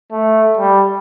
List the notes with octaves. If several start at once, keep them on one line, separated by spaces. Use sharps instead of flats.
A3
G3